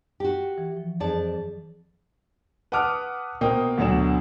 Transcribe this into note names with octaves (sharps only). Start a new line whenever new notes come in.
F#4 G4
E3
F3
F2 G#4 D5 A5
B4 F#5 A5 D6 D#6 F6
B2 A#3 C5 G5 D#6
D2 B2 F#3 D4 E7